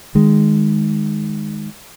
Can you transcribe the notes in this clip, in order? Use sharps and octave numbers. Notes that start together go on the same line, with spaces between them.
D#3 G#3